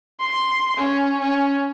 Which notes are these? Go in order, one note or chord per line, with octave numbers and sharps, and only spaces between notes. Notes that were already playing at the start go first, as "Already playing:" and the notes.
C6
C#4
C#4